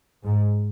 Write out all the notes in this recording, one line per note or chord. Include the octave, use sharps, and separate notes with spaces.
G#2